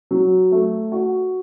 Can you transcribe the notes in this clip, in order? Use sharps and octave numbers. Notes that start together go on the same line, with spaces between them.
F#3
A3
F#4